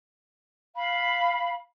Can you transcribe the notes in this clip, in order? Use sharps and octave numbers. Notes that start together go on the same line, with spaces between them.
F5 B5